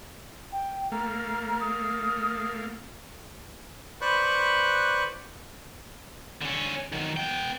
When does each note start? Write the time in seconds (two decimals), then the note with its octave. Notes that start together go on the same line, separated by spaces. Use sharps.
0.52 G5
0.92 A3 A#3 F5 A#5
1.61 D#6
4.01 B4 C5 D5 B5 C#6 F#6
6.42 D3 C#4
6.92 D#3 F#3
7.17 B3 G5